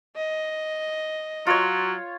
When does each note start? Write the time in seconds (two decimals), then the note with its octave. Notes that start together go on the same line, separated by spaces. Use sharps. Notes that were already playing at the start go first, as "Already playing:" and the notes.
0.16 D#5
1.47 F#3 F4 C#5